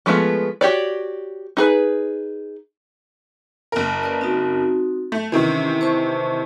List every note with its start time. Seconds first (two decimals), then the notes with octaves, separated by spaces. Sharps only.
0.06 F3 G#3 A3 B3 F4
0.61 F#4 G4 C#5 D5
1.57 D#4 G#4 B4
3.72 F#1 A#4
4.03 B4 D5
4.21 C4 D#4 F#4
5.12 A3
5.32 C3 D#3 E3 C#4
5.81 C5 A5 C#6